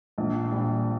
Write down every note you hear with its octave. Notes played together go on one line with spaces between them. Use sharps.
A#1
A#2 G3